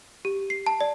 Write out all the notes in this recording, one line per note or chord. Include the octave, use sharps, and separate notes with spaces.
G4
C7
A5
D5